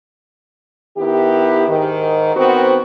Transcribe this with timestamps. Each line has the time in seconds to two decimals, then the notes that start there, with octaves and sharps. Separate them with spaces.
0.97 D#3 B3 E4 G4
1.68 G#2 D#3
2.35 D#3 B3 C4 F#4 C5